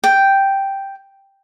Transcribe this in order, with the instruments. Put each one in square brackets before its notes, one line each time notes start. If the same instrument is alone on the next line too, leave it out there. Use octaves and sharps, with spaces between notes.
[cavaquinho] G5